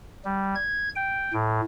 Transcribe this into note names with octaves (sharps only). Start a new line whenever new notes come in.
G3
G#6
G5
A2